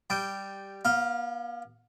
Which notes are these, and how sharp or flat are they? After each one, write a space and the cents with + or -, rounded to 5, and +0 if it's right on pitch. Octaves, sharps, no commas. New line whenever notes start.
G3 +0 G5 -10
B3 -45 F5 +0